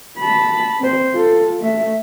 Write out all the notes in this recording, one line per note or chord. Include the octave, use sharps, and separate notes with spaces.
A5 B5
C4 C5
F4 A4
A3 E5